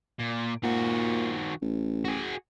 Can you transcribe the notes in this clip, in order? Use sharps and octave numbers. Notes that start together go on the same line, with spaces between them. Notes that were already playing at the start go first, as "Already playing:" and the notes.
A#2
A#2 D#3 F#4
A1
F#4 G#4